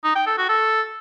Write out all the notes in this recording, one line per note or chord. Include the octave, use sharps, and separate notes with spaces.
D#4
G5
A4
F#4
A4